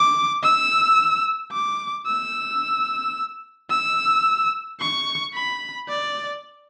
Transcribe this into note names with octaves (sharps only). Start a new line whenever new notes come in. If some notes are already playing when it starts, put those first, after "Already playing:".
Already playing: D6
E6
D6
E6
E6
C#6
B5
D5